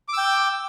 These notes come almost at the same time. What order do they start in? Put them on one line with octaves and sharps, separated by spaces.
D6 E6 G5